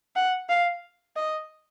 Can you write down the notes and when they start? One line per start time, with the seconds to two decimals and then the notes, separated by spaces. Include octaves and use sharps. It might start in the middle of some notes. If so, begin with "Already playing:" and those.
0.16 F#5
0.50 F5
1.16 D#5